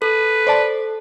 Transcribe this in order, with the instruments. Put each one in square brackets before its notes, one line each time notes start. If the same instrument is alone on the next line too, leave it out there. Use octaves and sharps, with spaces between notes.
[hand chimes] A4 [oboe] B4
[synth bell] C5 D5 A5